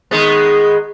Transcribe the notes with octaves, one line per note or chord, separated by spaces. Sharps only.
D#3 G#3 B3